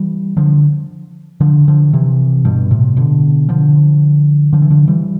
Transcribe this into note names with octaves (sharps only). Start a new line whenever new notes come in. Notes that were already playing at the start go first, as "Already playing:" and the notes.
Already playing: E3 G3
D3 F3
D3 F3
D3 F3
C3 E3
G2 B2
A2 C3
B2 D3
D3 F3
D3 F3
E3
D3 F3
E3 G3